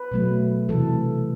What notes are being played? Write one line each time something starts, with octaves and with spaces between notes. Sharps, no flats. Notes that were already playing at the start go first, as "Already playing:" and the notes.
Already playing: B4
B2 F#3 A3
C3 E3 A3 A4